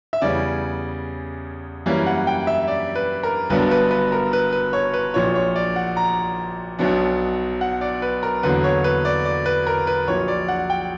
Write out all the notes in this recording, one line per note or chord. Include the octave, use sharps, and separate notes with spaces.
E5
E2 C#3 E3 G3 C#4 D5
F#2 E3 G3 A#3 C#4
F#5
G5
E5
D5
B4
A#4
G1 G2 F#3 B3 D4 B4
B4
B4
A#4
B4
B4
C#5
B4
A#1 A#2 F#3 C#5
C#5
D5
F#5
A#5
B1 B2 F#3 B3 D4
F#5
D5
B4
A#4
E2 D3 F#3 A#3 B4
C#5
B4
D5
D5
B4
A#4
B4
A#1 A#2 F#3 C#5
D5
F#5
G5